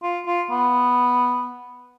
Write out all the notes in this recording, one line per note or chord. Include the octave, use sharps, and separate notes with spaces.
F4
F4
B3